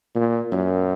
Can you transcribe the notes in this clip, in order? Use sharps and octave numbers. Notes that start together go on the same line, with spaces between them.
A#2
F#2